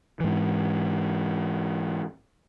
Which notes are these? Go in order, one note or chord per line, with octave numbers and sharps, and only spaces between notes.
G#2 E3